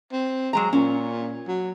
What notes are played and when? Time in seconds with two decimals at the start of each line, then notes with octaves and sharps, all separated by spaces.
0.12 C4
0.53 F#3 G#3 A#5
0.73 A#2 C#4
1.48 F#3